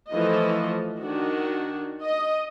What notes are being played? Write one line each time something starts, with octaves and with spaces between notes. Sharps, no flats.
E3 F3 A3 D#5
D#3 D4 F#4
D#5